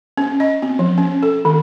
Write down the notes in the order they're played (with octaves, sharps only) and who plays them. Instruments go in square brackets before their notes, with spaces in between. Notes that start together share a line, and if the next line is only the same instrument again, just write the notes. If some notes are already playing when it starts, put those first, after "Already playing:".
[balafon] C#4
D#5
C4
F3
C#4
A4
D#3